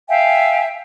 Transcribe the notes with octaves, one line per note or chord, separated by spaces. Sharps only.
E5 F5 G5 G#5